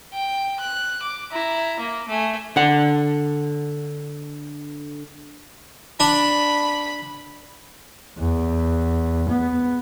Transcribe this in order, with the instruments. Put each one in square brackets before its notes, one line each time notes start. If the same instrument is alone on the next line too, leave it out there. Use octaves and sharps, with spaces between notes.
[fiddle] G5
F#6
D6
E4 A#5
A#3
A3 G#5
[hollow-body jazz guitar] D3 F#5
[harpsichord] D4 [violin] B5
[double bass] E2
B3